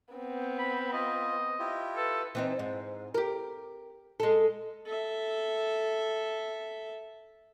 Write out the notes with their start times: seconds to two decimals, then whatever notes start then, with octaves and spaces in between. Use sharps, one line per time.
0.14 B3 C4
0.59 B5
0.93 F4 D#5
1.59 E4 F4 G4
1.96 A4 B4
2.35 E3 C4 D#4
2.59 G#2
3.14 G4 A#4
4.20 G#3 A4
4.85 A4 E5